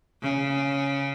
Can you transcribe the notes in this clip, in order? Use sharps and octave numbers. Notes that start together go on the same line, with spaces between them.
C#3